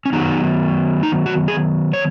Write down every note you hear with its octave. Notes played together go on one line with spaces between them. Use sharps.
C#4
D#3 F#3 B3 D#4
D#4
F#4
G#4
C#5